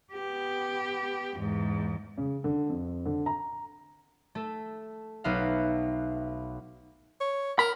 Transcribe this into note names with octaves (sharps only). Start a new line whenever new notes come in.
B3 G4
E2 G#2
C#3
D3
F2
D3
A#5
A3 A4
B1 B3 D#4 B4 E5 F5
C#5
A#4 B5